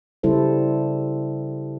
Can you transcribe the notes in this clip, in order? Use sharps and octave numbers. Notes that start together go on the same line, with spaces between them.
C#3 G3 E4 A4 C5